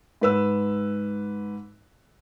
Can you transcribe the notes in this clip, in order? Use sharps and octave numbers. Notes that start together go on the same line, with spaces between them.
G#2 B4 E6